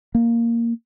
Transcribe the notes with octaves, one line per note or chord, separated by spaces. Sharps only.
A#3